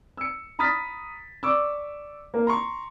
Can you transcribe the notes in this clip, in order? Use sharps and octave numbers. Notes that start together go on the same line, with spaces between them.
E6 C#7
A#5 B5 D#6 F6 A6 B6
D5 C#6 D6 E6
A#3 A#4
A#5 C6 C#6